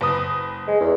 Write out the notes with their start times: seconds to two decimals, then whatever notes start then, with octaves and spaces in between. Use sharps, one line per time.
0.01 F#1 B4 D#6
0.68 G#3
0.81 E2